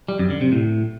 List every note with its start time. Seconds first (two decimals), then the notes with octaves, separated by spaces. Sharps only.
0.08 G3
0.19 F#2
0.30 D3
0.41 C3
0.52 A2